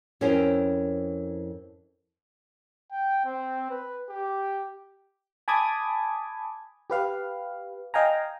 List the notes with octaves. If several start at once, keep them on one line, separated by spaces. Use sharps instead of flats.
F2 C#4 E4 A#4 C5 G5
G5
C4
B4
G4
G#5 A5 B5 D6 D#6 G#6
G4 B4 F5
D#5 F5 G5 G#5 A#5